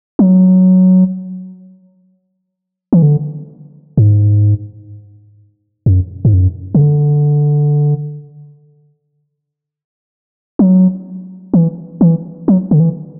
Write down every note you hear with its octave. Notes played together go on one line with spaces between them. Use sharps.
F#3
E3
D3
G#2
F#2
G#2
F#2
C#3
D3
F#3
E3
E3
F#3
D3
E3